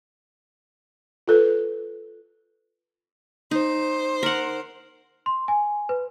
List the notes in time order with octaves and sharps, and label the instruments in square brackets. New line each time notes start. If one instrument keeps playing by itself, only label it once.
[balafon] F4 A4 B4
[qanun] D#4 [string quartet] C5
[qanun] A#4 F#5
[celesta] C6
G#5
B4